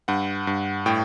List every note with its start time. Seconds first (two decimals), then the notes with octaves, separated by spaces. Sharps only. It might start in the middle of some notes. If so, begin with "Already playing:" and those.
0.08 G2 F#5
0.47 G2
0.86 A2 G5